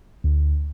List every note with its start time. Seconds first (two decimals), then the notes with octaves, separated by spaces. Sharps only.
0.24 D2